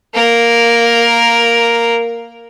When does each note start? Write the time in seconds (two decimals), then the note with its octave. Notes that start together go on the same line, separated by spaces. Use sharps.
0.14 A#3 A#4